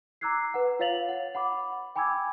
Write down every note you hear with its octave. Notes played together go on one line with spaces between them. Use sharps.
A#5 D6 E6 F#6 G#6 C7
B4 F#5
F4 C#5 F5 A6 F7 F#7
F#5
F#5 B5 D6
G5 G#5 B5 D6 E6 G#6